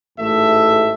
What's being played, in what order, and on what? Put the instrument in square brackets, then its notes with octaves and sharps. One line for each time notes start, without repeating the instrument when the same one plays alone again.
[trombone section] A1 G#2 A3 [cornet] E5